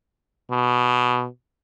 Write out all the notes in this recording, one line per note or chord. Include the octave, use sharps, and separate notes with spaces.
B2